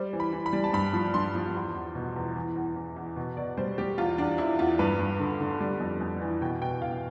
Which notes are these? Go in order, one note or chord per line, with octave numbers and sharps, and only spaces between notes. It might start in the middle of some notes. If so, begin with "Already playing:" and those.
Already playing: G3 C5
E3
B5
E3
B5
G3
A5
G2 B5
F3
G2 C6
F3
E2
E2
B2
E2
E3
E2
E2
E2
B2
B2 D5
G3 C5
G3 G4
E2 F4
E2 D4
E2 E4
E2 F4
G2 B4
G2
D3
D3
G3
F2
F2
E3
B2 G5
B2 G5
B2 F5